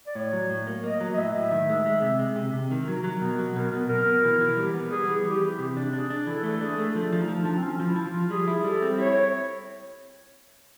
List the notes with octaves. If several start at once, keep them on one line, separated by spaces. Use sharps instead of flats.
D5
A2 C#5
F#3
A2
A#3
A#3 D#5
F#3
D#5
A2 E5
A2
D#3
G#3
G#3
C3
G#3
C3
C3
D#3
F#3 A#4
F#3
B2
F#3
B2 A#4
B2
B2 A#4
B2
E3
E3
G3
B3
G3 G#4
E3
E3 G4
E3
C3
D4
D4 G#4
D4
E3 A4
A3
D4 G#4
A3
F3 A4
F3 D#4
F3
D4
F3
C4
F3 C#4
F3
E4
F3
F4
F3
G3 G#4
E4
G3 A4
C4
E4 C#5
C4